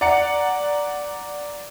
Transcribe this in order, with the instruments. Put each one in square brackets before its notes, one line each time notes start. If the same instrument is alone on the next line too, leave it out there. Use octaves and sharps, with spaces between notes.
[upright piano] D5 F#5 A#5 C#7